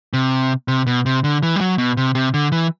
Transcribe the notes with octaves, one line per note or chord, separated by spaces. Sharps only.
C3
C3
B2
C3
D3
E3
G3
F#3
B2
C3
C3
D3
E3